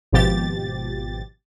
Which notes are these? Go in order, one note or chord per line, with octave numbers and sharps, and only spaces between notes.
G#1 B2 F3 G4 A6